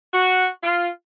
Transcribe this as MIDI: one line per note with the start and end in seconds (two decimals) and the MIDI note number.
0.13 0.48 66
0.63 0.88 65